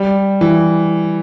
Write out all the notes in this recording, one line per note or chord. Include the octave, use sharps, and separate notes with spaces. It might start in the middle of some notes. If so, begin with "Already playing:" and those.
Already playing: G3
E3